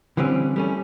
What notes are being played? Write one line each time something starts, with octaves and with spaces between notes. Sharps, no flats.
D3 E3 G3 C4 C#4
G3 A3 C#4